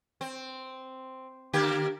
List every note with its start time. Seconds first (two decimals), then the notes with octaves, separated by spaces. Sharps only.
0.21 C4
1.53 D3 A#3 G4